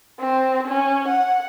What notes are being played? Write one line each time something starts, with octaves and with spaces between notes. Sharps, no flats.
C4
C#4
F#5